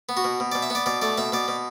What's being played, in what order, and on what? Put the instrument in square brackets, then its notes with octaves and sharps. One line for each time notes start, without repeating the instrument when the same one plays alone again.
[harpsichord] B3
F#4
B2
B2
B2 D5
E5
B3 D5
B2 D5
A3 D5
B2 E5
B2 D5
B2